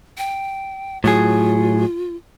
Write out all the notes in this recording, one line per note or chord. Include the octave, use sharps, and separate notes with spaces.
G5
A2 F#3 F4 G#4